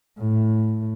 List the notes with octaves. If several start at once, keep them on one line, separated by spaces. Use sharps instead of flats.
A2